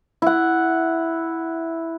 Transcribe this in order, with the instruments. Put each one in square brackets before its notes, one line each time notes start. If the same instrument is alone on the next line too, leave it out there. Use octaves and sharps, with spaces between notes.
[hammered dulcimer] E4 F#5